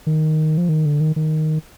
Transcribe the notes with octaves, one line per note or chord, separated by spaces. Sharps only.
D#3
F3
D#3
D3
D#3
D#3